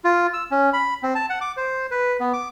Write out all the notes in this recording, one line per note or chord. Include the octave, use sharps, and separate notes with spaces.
F4
E6
C#4
B5
C4
A5
F#5
D6
C5
B4
B3
D6